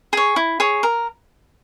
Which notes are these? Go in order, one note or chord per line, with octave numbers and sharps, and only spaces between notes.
G#4 C#5
E4
G#4 C#5
A#4